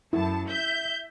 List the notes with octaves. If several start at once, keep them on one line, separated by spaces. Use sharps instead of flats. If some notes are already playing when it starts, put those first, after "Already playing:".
F#2 E4 A5
E5 G6